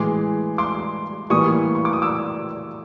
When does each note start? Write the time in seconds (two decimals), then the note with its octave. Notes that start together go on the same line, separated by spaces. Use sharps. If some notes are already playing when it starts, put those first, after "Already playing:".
Already playing: A2 E3 G#3 C6 D6
0.58 C6 D6
1.30 A2 E3 G3 A#3 C#6 D#6
1.75 C#6
1.85 D6
1.93 D#6
2.02 D6 E6